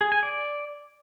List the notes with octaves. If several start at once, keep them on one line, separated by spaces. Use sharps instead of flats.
G#4
G#5
D5